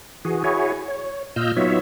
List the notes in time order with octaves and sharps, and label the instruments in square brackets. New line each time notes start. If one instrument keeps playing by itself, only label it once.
[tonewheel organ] E3 F#4 G#4
E4 F#4 G#4 C#5
C#5
A#2 F4 D#5 E6 F6 G6
F#3 B3 D#4 F4 C#5 E5